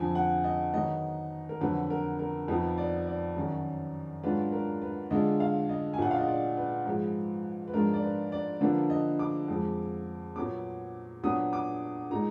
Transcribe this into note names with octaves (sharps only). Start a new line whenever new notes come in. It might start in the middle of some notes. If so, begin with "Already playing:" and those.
Already playing: F2 D3 F3 G#5
F#5
D#5
D#3 F#3 B3 D#4 D#5
A#4
F2 D3 F#3 B4
A#4
A#4
F2 F3 B3 D#4 B4
D5
D5
F#2 D#3 F#3
G#2 F#3 D4 F4 B4
A#4
B4
D3 G#3 D4 F4 D#5
F5
D#5
G#5
A#2 F#3 D4 F4 F#5
F5
D#5
D5
B4
G#2 F3 G#3
B4
G#2 F3 G#3 D4 F4 A#4
D5
B4
D5
D3 F3 A#3 D4 B4
D#5
D6
F2 F3 G#3
A#2 F#3 B3 D6
A#2 F#3 B3 D4 D#6
D6
A#2 G#3 D#4 A#5